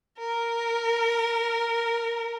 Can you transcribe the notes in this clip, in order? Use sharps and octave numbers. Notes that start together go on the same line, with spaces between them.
A#4